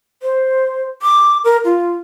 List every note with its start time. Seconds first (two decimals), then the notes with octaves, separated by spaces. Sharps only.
0.23 C5
1.02 D6
1.45 A#4
1.65 F4